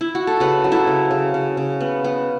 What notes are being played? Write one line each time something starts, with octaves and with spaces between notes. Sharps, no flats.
E4
F#4
A4
C#3 F#4 B4
F#3
E4 A4
C#3
C#3
C#3
C#3
B3
B3